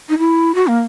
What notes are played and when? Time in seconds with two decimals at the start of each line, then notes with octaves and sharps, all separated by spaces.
0.09 D#4
0.18 E4
0.55 F#4
0.67 A#3